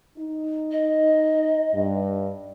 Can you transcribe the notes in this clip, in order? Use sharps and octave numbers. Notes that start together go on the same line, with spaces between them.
D#4
D#5
G2